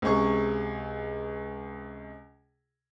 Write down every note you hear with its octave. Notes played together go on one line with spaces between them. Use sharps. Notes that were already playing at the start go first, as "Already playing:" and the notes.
C#2 C3 G#4 C#6